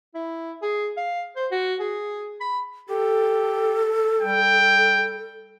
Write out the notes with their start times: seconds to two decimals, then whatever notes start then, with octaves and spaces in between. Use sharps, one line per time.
0.15 E4
0.62 G#4
0.97 F5
1.36 C5
1.51 F#4
1.80 G#4
2.41 B5
2.90 G4 A4
4.21 G3 G5